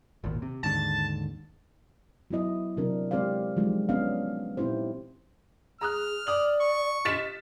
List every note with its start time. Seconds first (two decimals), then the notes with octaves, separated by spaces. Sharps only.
0.24 G#1 D#2 A#2
0.42 C3
0.63 D#2 G#2 D3 A5
2.31 F#3 B3 E4 D#5
2.77 C3 F#3 C4 D4 A#4
3.11 G#3 C4 G4 C5 D5 F5
3.57 F3 F#3 G#3 D#4
3.89 B3 C#4 D4 D#5 F5
4.57 A#2 C4 D#4 E4 G4 C5
5.81 G#4 A#5 D#6 F6 F#6
6.27 D5 D6 D#6 F#7
6.61 C#6
7.05 D#5 A6 B6 E7